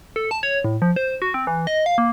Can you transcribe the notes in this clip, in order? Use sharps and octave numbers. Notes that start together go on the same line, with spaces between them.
A4
A5
C#5
A2
F3
C5
F#4
C4
E3
D#5
F5
A#3